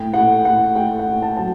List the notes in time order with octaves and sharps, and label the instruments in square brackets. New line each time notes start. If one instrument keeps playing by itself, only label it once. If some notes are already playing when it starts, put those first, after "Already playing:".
Already playing: [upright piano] A2 G5
A2 F#5
A2 F#5
A3 G5
F#5
A2
A5
F#3 A5